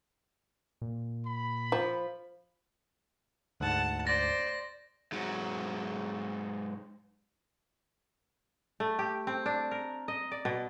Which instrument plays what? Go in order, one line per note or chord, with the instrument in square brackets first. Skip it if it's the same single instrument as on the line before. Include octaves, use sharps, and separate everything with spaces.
[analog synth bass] A#2
[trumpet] B5
[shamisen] F3
[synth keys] D2 G#2 [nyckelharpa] F#5 A5
[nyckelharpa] C5 D5 [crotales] A6 A#6
[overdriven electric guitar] G#2 F#3
[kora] A3
G4
C4
D4
A#4
D#5
D5
B2